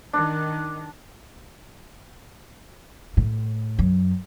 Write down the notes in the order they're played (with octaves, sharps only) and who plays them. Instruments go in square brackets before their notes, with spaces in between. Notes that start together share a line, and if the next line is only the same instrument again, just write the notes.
[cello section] D#3 [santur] D4
[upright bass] A2
F#2